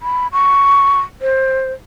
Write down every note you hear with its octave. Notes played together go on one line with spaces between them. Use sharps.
B5
C#6
C5